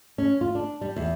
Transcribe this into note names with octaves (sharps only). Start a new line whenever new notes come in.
C#4
F4
D4
G3
E2